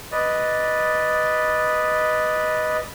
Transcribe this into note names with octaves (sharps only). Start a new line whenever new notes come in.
B4 D5 D#5